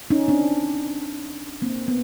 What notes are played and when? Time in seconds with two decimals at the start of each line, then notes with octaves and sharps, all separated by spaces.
0.10 C#4 D#4
0.28 C4 D4
1.62 A#3 C4
1.88 B3